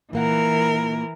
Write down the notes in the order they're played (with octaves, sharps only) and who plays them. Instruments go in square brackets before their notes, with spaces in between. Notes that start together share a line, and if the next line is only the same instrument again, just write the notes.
[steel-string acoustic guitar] A#2 A#3 F#5 [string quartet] E3 A#4